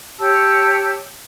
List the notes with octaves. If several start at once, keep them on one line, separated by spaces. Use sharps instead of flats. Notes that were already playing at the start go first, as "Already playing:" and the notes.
G4 C#5 A5 E6